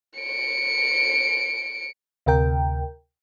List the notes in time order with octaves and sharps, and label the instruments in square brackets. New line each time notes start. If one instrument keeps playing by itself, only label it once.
[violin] C#7 D7
[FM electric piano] D2 C3 A#4 G5